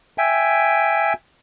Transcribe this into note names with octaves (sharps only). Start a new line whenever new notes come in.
E5 G5 G#5